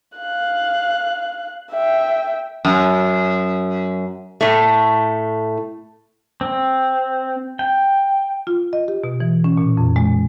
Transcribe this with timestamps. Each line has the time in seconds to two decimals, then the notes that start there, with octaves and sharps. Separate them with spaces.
0.17 F5 F#6
1.72 E5 G5
2.65 F#2
4.41 A2 A3
6.41 C4
7.59 G5
8.47 F4
8.73 D#5
8.88 G4
9.04 B2
9.20 E3
9.44 C#4
9.57 A#2
9.77 F2
9.96 G#3